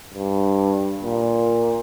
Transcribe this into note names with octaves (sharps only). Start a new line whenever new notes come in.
G2
A#2